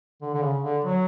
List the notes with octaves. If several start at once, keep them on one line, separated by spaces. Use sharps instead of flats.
D3
D3
C#3
D3
F#3